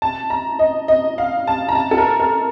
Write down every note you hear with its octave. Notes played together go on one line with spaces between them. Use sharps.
A5
A#5
D#5
D#5
F5
A5
A#5
A5
A4
A#4
A#4